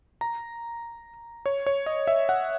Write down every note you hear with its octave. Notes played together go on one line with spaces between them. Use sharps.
A#5
C#5
C#5
D#5
E5
F#5